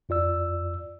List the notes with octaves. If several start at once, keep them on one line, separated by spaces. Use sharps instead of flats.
F2 F4 D5 E6